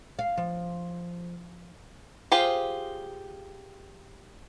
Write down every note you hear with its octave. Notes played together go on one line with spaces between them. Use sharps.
F5
F3
F4 G4 G#4 C5